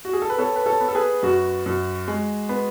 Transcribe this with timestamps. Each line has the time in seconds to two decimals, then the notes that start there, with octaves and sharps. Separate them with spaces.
0.05 F#4
0.13 G#4
0.22 A4
0.30 B4
0.38 B3 A4 C#5
0.56 B4
0.66 A4 C#5
0.81 B3
0.88 A4
0.95 G#4 B4
1.23 F#2 F#4
1.66 F#2
2.08 G#3
2.49 B3